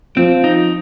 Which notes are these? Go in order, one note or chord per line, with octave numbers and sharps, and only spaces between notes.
F3 C4
D#4